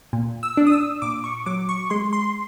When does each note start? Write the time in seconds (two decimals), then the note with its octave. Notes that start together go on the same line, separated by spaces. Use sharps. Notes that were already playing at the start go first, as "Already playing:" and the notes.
0.13 A#2
0.43 E6
0.57 D4
0.67 D#6
0.72 E6
1.02 A#2 D6
1.24 C#6
1.46 F#3 D6
1.69 C#6
1.90 G#3 C6
2.13 C6